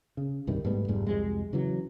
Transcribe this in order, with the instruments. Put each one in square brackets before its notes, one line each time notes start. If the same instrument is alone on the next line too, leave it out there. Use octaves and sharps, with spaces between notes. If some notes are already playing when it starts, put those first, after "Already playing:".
[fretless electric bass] C#3
C2 G2 C3 D#3
G#2 G3 A3 B3
F1 G#2 G3 G#3
C2 F2 C3 G#3
C#3 E3 F#3